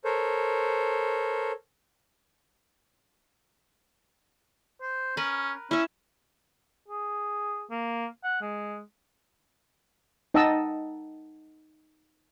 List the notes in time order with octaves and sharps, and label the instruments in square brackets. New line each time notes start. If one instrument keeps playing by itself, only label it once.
[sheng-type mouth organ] A4 A#4 C5 C#5
[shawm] C5
[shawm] C#4 [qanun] A#4 B4
[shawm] C#4 [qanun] E4 E5
[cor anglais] G#4
A#3
F#5
G#3
[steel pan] D#4 D#5 F#5 G5 A5 E6